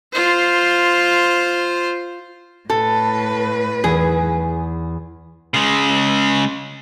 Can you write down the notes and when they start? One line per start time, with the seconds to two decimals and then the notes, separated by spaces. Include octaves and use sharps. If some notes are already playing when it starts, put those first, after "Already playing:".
0.13 F4 C5
2.70 A2 A4 B4
3.84 E2 G#4
5.54 C#3 G#3